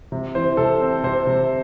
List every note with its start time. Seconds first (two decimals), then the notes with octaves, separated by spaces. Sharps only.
0.12 C3
0.35 E3 C5
0.57 C3 A4
0.81 C4
1.04 C3 C5
1.27 C3